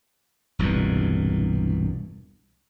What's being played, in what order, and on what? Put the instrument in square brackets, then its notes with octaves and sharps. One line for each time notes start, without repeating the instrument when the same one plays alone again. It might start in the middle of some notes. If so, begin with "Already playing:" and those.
[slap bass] E1 C2 G2 A#2